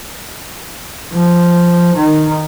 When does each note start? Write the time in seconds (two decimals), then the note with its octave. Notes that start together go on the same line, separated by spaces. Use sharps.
1.13 F3
1.95 D#3